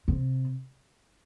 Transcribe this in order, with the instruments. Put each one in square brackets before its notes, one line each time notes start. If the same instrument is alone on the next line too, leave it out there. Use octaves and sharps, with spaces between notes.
[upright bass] C3